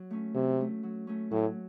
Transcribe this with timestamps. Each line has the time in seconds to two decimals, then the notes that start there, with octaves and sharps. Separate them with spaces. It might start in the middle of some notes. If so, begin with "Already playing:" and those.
Already playing: F#3
0.11 A3 C#4
0.34 C3 F#3
0.59 A3 C#4
0.83 F#3
1.07 A3 C#4
1.31 A2 F#3